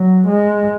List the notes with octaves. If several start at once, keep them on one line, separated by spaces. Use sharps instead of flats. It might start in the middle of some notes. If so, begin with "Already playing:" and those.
Already playing: F#3
G#3